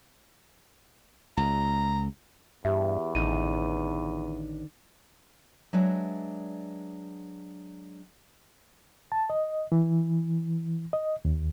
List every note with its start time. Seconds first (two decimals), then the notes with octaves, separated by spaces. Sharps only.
1.37 C#2 A#5
2.65 E2 G2 G4 E5
3.15 A1 D3 D#3 D#4 D#7
5.73 F#3 G#3 D4 B4 D5 E5
9.12 A5
9.30 D#5
9.72 E3
10.93 D#5
11.25 D#2